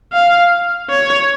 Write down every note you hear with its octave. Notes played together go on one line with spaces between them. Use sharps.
F5
C#5